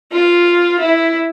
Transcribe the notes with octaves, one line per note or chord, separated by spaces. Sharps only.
F4
E4